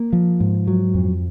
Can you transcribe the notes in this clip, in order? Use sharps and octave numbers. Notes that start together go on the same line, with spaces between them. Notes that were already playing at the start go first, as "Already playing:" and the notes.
Already playing: A#3
F3
G#2
F#3
F2